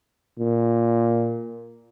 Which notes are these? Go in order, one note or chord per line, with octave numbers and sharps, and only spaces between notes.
A#2